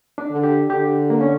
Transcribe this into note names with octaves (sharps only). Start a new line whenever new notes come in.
D4
D3
G4
D3 G4
A#3
C#4